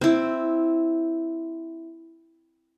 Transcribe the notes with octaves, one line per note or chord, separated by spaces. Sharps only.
C4 E4